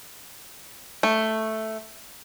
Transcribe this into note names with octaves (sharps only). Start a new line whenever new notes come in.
A3